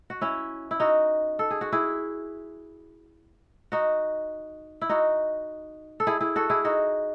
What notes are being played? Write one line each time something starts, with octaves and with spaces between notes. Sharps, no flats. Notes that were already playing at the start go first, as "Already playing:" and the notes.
F#4
C#4 E4
E4
D#4 F#4
A4
G#4
F#4
E4 G#4
D#4 F#4
E4
D#4 F#4
A4
E4 G#4
E4 G#4
F#4 A4
E4 G#4
D#4 F#4